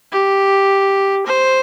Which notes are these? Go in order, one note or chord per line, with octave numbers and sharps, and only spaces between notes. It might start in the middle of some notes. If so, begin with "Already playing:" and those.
G4
C5